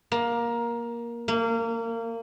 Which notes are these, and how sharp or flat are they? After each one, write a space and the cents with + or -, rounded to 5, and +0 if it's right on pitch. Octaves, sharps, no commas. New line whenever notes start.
A#3 +15
A#3 -25